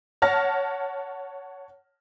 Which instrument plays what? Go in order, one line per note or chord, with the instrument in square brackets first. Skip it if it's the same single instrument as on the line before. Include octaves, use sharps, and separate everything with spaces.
[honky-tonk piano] C#5 F#5 A5 F6 A#6